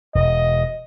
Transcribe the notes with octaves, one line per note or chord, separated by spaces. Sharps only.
E1 D#5